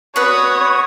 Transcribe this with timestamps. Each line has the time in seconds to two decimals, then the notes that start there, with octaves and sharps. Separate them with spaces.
0.16 F#4 B4 C#5 D5 C#6 D#6